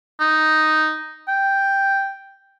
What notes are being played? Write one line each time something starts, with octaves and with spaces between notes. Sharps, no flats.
D#4
G5